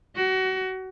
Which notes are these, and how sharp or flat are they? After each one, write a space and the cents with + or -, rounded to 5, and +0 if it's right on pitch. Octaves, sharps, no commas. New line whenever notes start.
F#4 +30